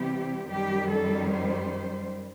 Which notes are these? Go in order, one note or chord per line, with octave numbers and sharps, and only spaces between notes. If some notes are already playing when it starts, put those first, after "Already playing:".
Already playing: C3 E3 G3 B3 G4
F#2 D#3 G3 G4
A4
C5